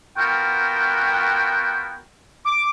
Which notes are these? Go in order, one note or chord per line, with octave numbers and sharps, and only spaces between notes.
B3 F4 F#4 A#4 G5
D6